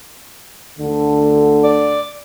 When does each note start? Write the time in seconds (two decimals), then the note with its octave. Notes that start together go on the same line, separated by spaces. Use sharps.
0.79 D2 D3
1.64 D5